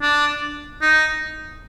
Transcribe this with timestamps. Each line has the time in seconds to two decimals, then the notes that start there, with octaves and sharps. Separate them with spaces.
0.02 D4
0.82 D#4